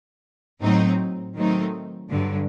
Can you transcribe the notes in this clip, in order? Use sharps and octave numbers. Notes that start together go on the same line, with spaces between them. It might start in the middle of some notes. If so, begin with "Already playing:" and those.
A2 F#3 C4 D#4
D#3 F#3 A3 C4 D#4
G2 D3 F#3